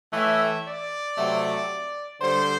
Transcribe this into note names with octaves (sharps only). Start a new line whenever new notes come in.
A2 E3 A3 E5
D5
C3 F#3 A3
D3 G3 C5